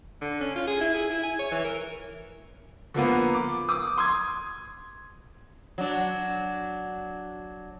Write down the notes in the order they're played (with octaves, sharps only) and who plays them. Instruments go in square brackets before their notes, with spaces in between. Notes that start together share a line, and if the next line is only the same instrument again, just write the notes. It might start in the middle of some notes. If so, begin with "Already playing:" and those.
[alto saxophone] D3
C#4
F4
G#4
E4
G#4
E4
G#5
C#5
E3
A#4
[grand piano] D3 F3 A#3 B3
D6
D6 D#6
C6 D#6 G#6
[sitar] F#3 D4